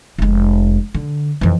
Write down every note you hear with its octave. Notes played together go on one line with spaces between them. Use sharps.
F1 G#3
D3
F2 E3